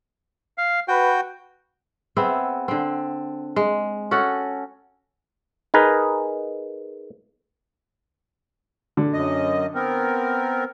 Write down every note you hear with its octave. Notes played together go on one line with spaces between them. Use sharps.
F5
F#4 B4 G5
B3 C4 G#4 E5
D3 C4
G#3
C#4 F#4 A4 F#5
D#4 G#4 A#4 B4
D3
F#2 D#5
B3 C4 A#4